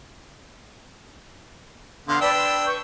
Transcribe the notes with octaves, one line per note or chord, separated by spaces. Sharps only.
D3 B3 F5 C6
D4 B4 D5 G5 E6
B4
B4 C#6 G6